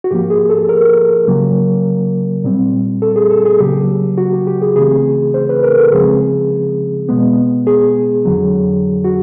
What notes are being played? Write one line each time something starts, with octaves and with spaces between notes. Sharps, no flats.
F#4
G#2 F3 A#3 G4
G#4
A4
A#4
C#3 F#3 A#3
A#2 G3 C4
A4
G#4
A4
G#4
C#3 F#3 A#3 G4
F#4
G4
G4
G#4
C#3 E3 A3 C4 G#4
C5
B4
A#4
A4
C#3 F3 G#3 C4 G#4
B2 G#3 B3
G#4
F2 D3 F#3
F#4